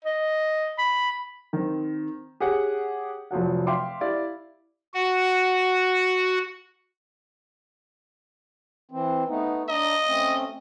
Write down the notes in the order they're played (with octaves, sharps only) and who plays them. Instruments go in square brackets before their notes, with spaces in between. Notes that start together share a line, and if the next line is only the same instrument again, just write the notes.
[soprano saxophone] D#5
B5
[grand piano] D#3 C4
G4 G#4 C#5 F#5
F1 F3 F#3 F#5
E5 F5 G5 C6 D6
E4 G4 D5 F5
[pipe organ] F#4 F#5
[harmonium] E3 C4
A3 B3 D#4
[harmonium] D4 A#5 [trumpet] D#5
[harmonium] A3 C4 C#4